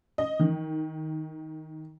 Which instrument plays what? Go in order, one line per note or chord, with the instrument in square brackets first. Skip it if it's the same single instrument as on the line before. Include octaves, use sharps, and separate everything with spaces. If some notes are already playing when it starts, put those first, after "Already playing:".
[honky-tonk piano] D#5
D#3